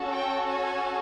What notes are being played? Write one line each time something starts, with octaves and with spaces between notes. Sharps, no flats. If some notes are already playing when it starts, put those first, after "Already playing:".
Already playing: C#4 F#4 A4
G5
G#5